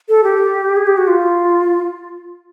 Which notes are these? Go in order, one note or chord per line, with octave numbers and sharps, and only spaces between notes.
A4
G4
G#4
G4
F#4
F4